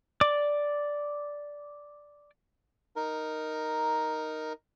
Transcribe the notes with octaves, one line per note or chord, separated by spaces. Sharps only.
D5 D6
D#4 A#4